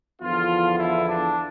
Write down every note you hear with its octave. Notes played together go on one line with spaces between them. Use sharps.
E2 D3 F3 B3 F4
E4
D4